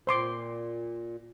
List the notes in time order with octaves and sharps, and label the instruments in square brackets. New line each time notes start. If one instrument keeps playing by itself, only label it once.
[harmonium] A#2 [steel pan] C5 C6 D6